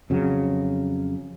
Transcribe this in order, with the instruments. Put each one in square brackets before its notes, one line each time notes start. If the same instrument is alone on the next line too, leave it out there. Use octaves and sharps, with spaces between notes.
[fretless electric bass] F2 C#3 F#3